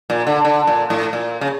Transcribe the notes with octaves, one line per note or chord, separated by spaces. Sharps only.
A#2
D3
D3
A#2
A2
A#2
C#3